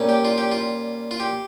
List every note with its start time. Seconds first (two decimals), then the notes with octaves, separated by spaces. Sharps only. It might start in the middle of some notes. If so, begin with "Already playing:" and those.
Already playing: A#2 G3 C#4
0.09 G4
0.25 F4
0.38 G4
0.51 F4
1.11 F4
1.20 G4